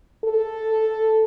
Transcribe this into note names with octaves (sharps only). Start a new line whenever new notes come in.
A4